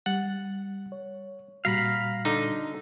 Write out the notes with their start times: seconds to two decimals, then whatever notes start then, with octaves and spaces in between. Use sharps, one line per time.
0.06 G3 F#5 A6
0.92 C#5
1.65 A#2 G3 F#4 F5 A#5 B5
2.25 D3 D#4